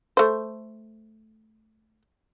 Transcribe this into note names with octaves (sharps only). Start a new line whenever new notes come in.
A3 C5